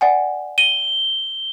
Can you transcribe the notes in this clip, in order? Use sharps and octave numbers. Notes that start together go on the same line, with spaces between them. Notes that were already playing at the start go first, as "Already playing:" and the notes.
D5 F#5 G#5
D#7 G7